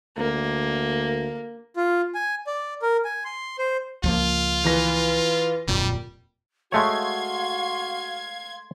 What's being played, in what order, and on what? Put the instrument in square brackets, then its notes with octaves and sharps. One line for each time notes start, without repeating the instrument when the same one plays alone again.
[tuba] D2 [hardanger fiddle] A#3
[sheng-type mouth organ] F4
G#5
D5
A#4
G#5
C6
C5
[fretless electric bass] C#2 F3 A#3 [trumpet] F4
[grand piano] E3 B4 A#6
[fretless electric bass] D1 F2 A#2 [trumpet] G3
[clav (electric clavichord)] G#3 A3 C#5 [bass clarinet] F#4 [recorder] F5 [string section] C6 G#6